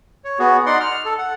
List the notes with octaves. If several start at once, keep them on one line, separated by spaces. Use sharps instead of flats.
C#5
B3 F#4 G#4
D#4 D5 F#5 C6
F6
A4
F#5